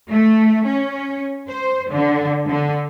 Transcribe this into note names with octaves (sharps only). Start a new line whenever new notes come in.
A3
C#4
C5
D3
D3